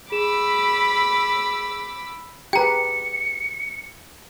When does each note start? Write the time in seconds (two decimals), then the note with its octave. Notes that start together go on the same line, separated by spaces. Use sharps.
0.12 G#4 B5 D6 E6 E7
2.53 G4 G#4 B4 G5 A#5 C#7